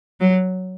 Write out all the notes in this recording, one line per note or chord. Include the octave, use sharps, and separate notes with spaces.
F#3